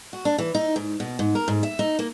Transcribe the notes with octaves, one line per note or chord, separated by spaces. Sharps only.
F#4
D4
E3
D#4
G#2
B2
G#2
A#4
G#2
E5
D#4
A#3